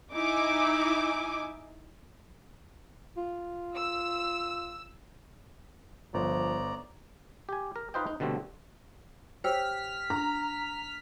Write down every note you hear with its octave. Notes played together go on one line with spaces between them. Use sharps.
D#4 E4 G#5 D6
F4
E6
G1 F3 C5 D5 A#5
G4 G#5
A#4
D#4 F4 B4 C5 D#5 G5
D#4
B2 D3 G3 A3 C4
G4 C5 C#5 E6 F6 B6
D4 A#5